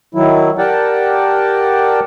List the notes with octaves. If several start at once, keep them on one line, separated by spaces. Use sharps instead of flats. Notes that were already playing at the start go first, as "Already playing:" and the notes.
D#3 F#3 E4
G4 A#4 D5 F#5 G5 A5